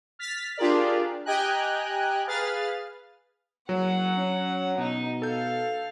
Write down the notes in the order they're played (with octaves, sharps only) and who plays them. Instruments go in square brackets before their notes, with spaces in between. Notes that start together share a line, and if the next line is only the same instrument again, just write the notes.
[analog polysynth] F6 A6 B6
D4 F4 G4 G#4 A#4 D5
G4 D#5 G5 G#5 A#5 F#6
G#4 B4 F5 F6 A6
[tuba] F#1 [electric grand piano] F#3 [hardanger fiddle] F#5
[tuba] C#4
[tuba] B2 [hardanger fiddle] D#4
[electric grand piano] A4 G6 [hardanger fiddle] F5